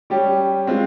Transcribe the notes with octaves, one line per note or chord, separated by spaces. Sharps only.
G3 C#4 G4
G#3 C4 F4